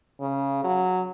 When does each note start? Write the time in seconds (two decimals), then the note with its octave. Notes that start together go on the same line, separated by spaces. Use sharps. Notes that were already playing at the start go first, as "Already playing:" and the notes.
0.21 C#3
0.64 F#3